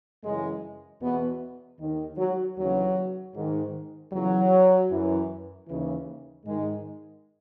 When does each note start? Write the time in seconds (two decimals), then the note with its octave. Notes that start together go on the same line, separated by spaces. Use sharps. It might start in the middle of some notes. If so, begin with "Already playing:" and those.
0.23 F#2 C#3 E3 G#3
1.01 E2 B2 B3
1.79 D#2 D#3
2.17 F#3
2.57 D#2 C#3 E3 F#3
3.34 G#2 D#3
4.12 E2 C#3 E3 F#3
4.90 F#2 E3
5.67 D#2 C#3 E3
6.45 G#2 D#3 G#3